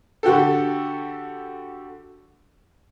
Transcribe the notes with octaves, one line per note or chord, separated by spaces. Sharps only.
D3 F#4 G4 A4